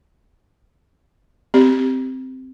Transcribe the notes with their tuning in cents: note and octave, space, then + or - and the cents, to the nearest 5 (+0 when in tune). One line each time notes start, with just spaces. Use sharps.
C4 -10 G4 +0